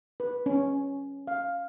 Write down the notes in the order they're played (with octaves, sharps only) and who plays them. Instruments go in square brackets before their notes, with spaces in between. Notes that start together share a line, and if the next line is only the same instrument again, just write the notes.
[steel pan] B4
C#4
F5